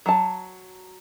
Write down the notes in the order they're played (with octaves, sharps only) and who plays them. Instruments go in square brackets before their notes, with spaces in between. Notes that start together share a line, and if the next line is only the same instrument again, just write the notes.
[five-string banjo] F#3 A5